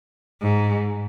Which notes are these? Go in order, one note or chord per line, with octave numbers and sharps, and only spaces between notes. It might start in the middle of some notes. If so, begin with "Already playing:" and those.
G#2